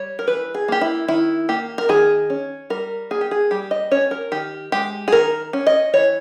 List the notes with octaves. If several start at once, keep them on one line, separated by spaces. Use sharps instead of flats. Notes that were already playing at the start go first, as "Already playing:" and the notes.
Already playing: G3 C#5
A#4
E3 B4
G#4
A#3 G4
E4
D#3 E4
A#3 G4
A#4
D#3 G#4
C#4
G3 A#4
A#3 G#4
G4
G#4
G3 G4
D#5
C#4 C#5
A#4
D#3 G4
G#3 G4
G#4
D#3 A#4
C#4
D#5
E3 C#5